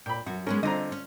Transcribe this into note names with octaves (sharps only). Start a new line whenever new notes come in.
A#2 G5 B5
F#2 F#4
G#3 B3 C#4 A#4
D3 C4 F4 D#5 A#5
C#4